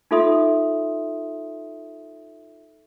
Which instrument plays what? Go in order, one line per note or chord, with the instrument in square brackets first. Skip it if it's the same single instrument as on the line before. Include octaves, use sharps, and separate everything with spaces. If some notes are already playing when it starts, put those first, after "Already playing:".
[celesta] D#4 F4 A4 E5 C6 D#6